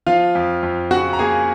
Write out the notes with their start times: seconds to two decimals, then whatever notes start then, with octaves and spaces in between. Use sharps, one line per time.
0.07 F3 F4 F5
0.35 F2
0.63 F2
0.91 C#3 F#4 F#5
1.13 A#5
1.19 A#3 G#4 G#5